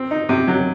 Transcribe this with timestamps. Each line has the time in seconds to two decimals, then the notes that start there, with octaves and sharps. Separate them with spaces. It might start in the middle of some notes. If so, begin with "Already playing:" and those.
Already playing: C4
0.11 D#4
0.29 C3
0.48 F#3